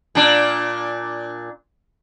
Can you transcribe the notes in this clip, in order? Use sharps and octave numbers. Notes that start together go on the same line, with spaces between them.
A#2 D4